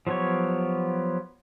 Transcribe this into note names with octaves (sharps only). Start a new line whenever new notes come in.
F3 F#3 B3 G4 C#5